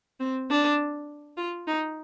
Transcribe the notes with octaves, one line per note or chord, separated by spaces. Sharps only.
C4
D4
F4
D#4